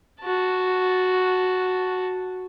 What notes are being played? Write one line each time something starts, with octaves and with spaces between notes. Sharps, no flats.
F#4 A5